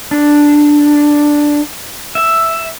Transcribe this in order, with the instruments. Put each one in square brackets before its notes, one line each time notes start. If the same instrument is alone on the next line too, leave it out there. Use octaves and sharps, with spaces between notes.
[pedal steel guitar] D4
E5